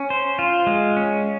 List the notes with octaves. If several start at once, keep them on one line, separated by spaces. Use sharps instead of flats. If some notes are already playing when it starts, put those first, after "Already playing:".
Already playing: C#4
C5
F4
G#3
C#4